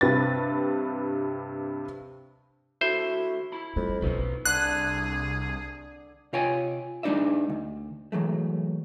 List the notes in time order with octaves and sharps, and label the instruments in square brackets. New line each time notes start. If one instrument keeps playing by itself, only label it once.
[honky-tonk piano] G2 C3 B4 A6
[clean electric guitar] D2 F#4 A4 [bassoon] E4 [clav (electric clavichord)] C5
[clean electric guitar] E4 B5
[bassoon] F2 [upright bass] G3
[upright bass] B1 C#4 [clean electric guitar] B3 D#4 B4
[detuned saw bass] C2 [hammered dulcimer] D3 [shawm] G#4 [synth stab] F#6
[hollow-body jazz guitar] C3 F4 C#5 G5 G#5
G#3 D4 D#4 D5 E5
D2
E3 F#3 G#3 A3